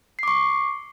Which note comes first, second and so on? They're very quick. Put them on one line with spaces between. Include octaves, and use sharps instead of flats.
C7 D6 C#6